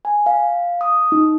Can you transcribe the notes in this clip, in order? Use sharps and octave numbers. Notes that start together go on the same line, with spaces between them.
G#5
F5
D#6
D#4